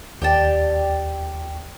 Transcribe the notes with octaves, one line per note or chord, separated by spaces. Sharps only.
D#2 G4 D5 G5 A5